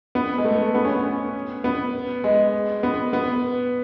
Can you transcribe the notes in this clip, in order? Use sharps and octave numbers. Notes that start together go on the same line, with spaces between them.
B3
G#3
A3
B3
C#4
B3
B3
G#3
B3
B3